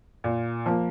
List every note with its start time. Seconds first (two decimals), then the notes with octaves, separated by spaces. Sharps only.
0.24 A#2
0.66 F3 A#3